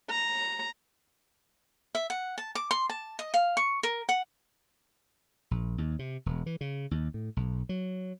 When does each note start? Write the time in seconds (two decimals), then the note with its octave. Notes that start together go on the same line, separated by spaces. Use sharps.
0.10 A#5
1.95 E5
2.10 F#5
2.38 A5
2.55 D6
2.71 C6
2.89 A5
3.19 D#5
3.34 F5
3.57 C#6
3.83 A#4
4.09 F#5
5.51 A#1
5.78 D#2
5.99 C3
6.26 E1
6.46 E3
6.61 C#3
6.91 D#2
7.14 A2
7.37 B1
7.69 F#3